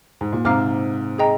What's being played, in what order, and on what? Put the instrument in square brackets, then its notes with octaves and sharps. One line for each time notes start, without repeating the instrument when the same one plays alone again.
[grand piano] G#2
A#2
[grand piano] G#2 C3 [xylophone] F5 A#5 D6 F6
[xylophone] G#4 D#5 G5 A#5